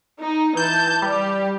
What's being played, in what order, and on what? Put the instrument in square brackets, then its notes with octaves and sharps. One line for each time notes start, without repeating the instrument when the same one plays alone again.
[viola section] D#4
[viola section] E3 A5 [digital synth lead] G6
[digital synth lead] G3 [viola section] G4